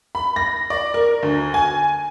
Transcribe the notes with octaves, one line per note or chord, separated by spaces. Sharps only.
B5
A#6
D5
A#4
D2
G#5